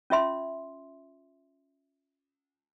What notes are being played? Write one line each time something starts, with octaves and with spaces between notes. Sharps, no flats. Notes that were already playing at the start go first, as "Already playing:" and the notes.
C#4 F4 E5 C6